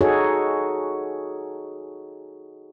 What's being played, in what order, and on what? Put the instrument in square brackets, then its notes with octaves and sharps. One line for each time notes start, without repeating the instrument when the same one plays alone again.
[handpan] D#4 F#4 G#4 A4 C#5